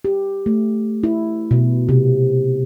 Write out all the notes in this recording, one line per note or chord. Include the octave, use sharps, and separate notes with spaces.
G4
A3
E4
B2
C3